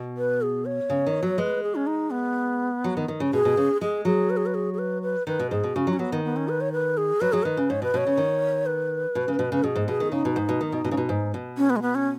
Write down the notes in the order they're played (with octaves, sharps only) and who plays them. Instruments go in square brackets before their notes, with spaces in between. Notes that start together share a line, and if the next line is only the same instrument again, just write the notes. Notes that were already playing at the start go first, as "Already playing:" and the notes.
Already playing: [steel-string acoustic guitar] B2
[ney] B4
G#4
C#5
[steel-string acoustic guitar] C#3
D#3
F#3
[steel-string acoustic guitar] G#3 [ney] B4
[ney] G#4
C#4
D#4
B3
[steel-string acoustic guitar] F#3
D#3
D#3
C#3
[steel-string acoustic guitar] B2 [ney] G#4
[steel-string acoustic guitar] B2
C#3
[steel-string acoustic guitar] G#3 [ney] G#4
[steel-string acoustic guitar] F#3 [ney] G#4
[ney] B4
G#4
B4
G#4
G#4
B4
B4
[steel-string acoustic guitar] D#3 [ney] B4
[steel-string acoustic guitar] B2
[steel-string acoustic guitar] G#2 [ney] G#4
[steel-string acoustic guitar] B2
[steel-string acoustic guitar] C#3 [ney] F#4
[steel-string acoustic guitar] F#3
[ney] C#4
[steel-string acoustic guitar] F#3 [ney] B3
[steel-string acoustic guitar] D#3
[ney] B3
C#4
B4
C#5
B4
G#4
[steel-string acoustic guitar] F#3 [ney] B4
[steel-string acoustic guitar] F#3 [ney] G#4
[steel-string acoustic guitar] D#3 [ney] B4
[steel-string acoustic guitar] C#3
[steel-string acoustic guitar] G#2 [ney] C#5
[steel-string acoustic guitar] B2 [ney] B4
[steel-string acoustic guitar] B2 [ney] C#5
[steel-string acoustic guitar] C#3
D#3
[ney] B4
[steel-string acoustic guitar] B2
C#3
B2
C#3
[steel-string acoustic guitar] B2 [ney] G#4
[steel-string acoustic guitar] G#2
[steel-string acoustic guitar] B2 [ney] G#4
[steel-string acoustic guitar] D#3
[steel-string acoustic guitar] C#3 [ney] D#4
[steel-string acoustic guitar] B2
G#2
B2
D#3
B2
B2
C#3
B2
G#2
B2
[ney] C#4
B3
G#3
B3
C#4